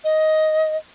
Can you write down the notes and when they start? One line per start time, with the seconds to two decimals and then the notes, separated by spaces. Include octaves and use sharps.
0.04 D#5